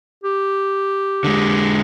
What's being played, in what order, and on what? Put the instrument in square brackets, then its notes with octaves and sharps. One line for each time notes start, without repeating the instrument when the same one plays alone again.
[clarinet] G4
[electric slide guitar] D3 G#3